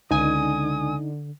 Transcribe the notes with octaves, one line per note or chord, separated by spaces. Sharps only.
C#2 D3 D#4 G#5 D#6